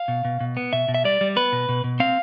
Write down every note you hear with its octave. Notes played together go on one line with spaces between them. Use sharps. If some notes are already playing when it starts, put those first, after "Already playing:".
Already playing: F5
B2
B2
B2
B3
B2 E5
B2
E5
G3 D5
G3
B3 B4
B2
B2
B2
C4 F5